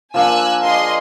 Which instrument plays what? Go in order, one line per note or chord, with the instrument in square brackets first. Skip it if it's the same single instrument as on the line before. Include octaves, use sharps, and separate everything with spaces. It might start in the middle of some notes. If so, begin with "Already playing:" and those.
[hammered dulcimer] F3 A#3 D4 [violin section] G#5 E6 F#6
[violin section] G#4 D#5 C6 [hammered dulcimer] A#4